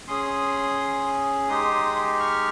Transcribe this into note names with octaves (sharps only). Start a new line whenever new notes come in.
C#4 G#4 C6 D#6
G#3 D#4 G4 C6 D#6
C#6 F6